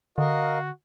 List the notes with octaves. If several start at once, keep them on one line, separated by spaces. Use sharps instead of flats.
D3 F#4 A#4 D#5 F5